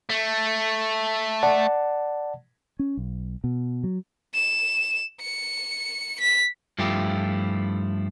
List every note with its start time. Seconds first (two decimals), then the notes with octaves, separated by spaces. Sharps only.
0.09 A3
1.43 D5 F#5 A5
2.79 C#4
2.97 B1
3.44 B2
3.84 F#3
4.34 E7
5.21 C#7
6.20 B6
6.79 G2 F3 A3 E4 F4 G4